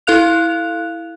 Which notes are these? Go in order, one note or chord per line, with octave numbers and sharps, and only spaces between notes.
E4 A4 F5 F#6 F7